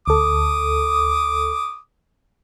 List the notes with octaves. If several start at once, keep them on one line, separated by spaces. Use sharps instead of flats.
D2 A4 D6 D#6